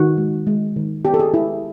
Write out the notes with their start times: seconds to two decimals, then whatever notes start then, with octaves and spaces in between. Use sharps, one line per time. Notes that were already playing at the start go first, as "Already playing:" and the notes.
Already playing: D#3 F#4
0.17 G#3
0.47 G#3
0.76 D#3
1.05 B3 G4
1.14 A4
1.19 G#4
1.34 G#3 E4